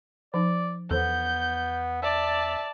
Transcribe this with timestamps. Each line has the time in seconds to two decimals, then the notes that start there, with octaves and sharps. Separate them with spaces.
0.34 F3 D#4 D5
0.91 E2 B3 A4 C5 G6
2.03 D5 E5 A5